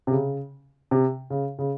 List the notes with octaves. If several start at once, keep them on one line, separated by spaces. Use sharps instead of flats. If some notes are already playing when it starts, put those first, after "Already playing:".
C3
C#3
C3
C#3
C#3